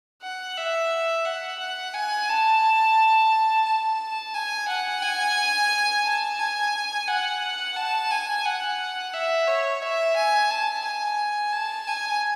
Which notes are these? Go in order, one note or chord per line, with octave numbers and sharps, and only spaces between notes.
F#5
E5
F#5
F#5
G#5
A5
A5
G#5
F#5
G#5
A5
G#5
F#5
A5
G#5
F#5
E5
C#5
E5
G#5
A5
G#5
A5
G#5